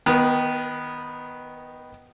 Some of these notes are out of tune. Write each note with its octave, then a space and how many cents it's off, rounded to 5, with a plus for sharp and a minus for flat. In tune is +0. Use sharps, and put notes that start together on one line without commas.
D#3 +0 B3 +0 A#4 +35